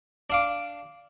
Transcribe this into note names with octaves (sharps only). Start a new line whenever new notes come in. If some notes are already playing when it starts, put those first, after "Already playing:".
D4 F5 D6